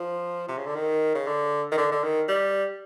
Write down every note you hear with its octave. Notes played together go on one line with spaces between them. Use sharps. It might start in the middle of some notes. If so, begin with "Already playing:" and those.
Already playing: F3
C3
C#3
D3
D#3
C#3
D3
D#3
D3
D3
D#3
G3